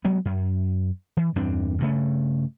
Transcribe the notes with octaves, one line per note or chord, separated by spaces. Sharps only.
F#3 G#3 B3
F#2
E3
E2 G2 C4 D4
G2 C#3 A3